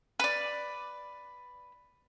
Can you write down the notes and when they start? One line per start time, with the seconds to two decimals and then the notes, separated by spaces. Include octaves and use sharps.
0.20 B4 D5